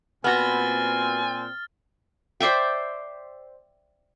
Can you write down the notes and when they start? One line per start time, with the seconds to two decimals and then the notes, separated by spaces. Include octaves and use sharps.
0.24 A#2 B3 C4 F#4 G#5 F6 A6
2.40 C5 D5 E5 G5